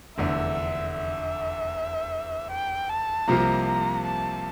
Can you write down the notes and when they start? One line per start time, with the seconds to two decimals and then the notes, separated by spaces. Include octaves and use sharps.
0.18 F1 E2 D3 E5
0.95 E5
2.51 G5
2.89 A5
3.27 C2 C3 F3 A#3 F4 A#5
3.66 A#5
4.05 A5